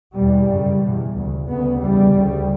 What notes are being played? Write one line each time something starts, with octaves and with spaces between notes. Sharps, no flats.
E2 B2 G3
F#2 C#3
E2 B2
D2 C#3
D2 C#3 B3
E2 C#3 G3
D2 C#3